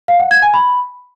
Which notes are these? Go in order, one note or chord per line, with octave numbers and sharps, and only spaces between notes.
F5
F#5
G#6
G#5
B5